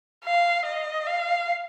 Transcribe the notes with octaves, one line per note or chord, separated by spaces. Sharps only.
F5
D#5
F5